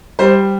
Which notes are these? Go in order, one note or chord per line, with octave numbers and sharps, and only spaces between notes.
G3 C5